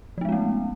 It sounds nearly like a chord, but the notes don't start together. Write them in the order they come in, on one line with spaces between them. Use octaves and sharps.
F3 B3 G#3 C#4 A3